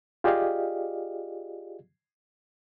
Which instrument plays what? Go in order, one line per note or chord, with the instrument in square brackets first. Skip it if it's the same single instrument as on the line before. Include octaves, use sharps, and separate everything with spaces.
[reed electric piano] F4 G4 G#4 D5 D#5 F5